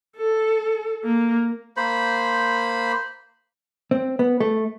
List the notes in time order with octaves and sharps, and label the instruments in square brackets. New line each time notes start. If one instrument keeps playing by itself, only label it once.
[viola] A4
A#3
[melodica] A#3 C5 B5
[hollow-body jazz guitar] C4
B3
A3